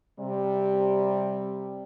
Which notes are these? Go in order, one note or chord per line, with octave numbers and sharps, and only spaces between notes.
C3 G3